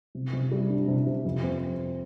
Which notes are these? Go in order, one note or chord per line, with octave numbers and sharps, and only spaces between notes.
C3
C3
G3
D4
C3
C3
F2
C4